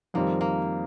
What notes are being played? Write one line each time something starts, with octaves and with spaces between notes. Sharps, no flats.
F2 D#3 G3 A#3 C4
A#3